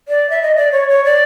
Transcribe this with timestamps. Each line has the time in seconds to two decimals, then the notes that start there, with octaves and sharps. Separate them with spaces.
0.08 D5
0.30 E5
0.42 D#5
0.56 D5
0.72 C#5
0.89 C#5
1.04 D5